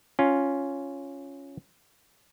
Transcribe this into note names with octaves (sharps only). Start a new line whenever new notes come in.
C#4 F4